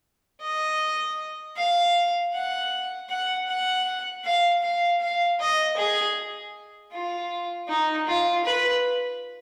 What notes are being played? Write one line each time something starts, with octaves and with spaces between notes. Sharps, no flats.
D#5
F5
F#5
F#5
F#5
F5
F5
F5
D#5
G#4
F4
D#4
F4
B4